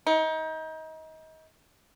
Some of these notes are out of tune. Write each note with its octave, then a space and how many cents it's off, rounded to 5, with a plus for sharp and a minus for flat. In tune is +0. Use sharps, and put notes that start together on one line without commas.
D#4 +30